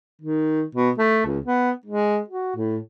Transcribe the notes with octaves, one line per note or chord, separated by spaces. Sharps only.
D#3
B2
A3
C#2
B3
G#3
F#4
A2